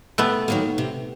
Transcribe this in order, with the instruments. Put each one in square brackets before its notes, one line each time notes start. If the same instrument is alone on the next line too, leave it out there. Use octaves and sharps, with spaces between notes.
[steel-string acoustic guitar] C3 [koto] A3 B3
[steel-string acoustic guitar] D#3 F#3 A#3
C3